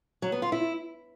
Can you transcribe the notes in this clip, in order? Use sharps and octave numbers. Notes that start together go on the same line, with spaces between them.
F#3
B3
F4
E4